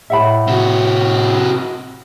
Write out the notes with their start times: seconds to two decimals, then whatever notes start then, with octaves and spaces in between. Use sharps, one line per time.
0.10 A2 E5 F#5 B5
0.47 C3 F#4